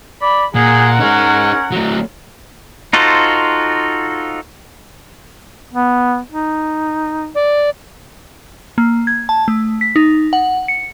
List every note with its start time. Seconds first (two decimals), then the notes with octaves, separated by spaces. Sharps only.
0.22 D5 B5
0.55 A#2 G#4 A#4 F#5
1.00 C#4 D#4 G#4
1.72 F#3 A3
2.93 D#4 F4 F#4 A4 C5
5.74 B3
6.31 D#4
7.35 D5
8.78 A#3
9.07 G#6
9.29 A5
9.48 A3
9.81 B6
9.96 D#4
10.33 F#5
10.68 C#7